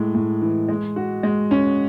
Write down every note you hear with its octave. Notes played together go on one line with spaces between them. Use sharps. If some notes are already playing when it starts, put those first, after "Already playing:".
Already playing: A2 G#3
A2
E3
G#3
F#4
G#3
C#4